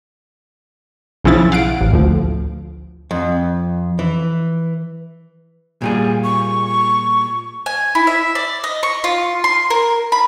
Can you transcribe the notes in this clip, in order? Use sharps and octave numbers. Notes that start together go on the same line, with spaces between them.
B1 C#3 F3 E4 A6
F5 F#5 D7
A1
D2 F3
F2
E3
A#2 G3 G#4
C#6
G#5
E4
E5
D5
D#5
C#6
F4
C6
A#4
B5